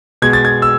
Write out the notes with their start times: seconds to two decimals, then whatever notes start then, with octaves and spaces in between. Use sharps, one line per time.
0.22 B2 G#3 G#6
0.33 A6
0.45 G#6
0.62 E6